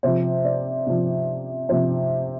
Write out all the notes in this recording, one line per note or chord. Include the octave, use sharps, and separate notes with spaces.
C3 F3 C5
D5
C3 F3
C3 F3 C5